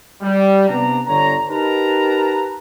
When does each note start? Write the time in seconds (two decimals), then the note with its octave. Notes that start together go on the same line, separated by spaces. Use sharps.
0.22 G3
0.68 C3 B3 D4 A#5
1.07 G1 D3 C#5 A#5
1.49 D#4 G4 A#4 B4 A5 A#5